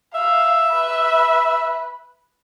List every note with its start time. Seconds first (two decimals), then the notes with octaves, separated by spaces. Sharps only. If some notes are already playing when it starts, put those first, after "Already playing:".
0.15 E5 F5
0.73 B4